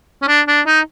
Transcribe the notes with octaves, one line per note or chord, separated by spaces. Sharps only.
C#4
D4
D4
D#4